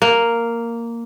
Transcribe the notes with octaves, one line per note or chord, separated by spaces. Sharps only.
A#3